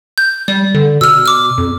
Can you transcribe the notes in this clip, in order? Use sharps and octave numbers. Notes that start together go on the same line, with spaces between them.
G6
G3 D5
D3
B2 E6 F6
D6 F6
F2